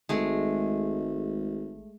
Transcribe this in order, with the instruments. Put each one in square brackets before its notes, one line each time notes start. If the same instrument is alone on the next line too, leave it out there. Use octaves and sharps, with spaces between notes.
[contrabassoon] G#1 [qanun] G#3 A3